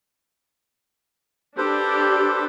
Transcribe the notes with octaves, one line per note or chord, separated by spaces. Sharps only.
D4 G4 A4 B4 C5